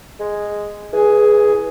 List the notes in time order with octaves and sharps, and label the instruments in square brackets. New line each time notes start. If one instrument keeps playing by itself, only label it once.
[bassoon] G#3
[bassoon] E3 [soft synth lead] G#4